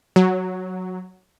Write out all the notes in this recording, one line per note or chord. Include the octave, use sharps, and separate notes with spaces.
F#3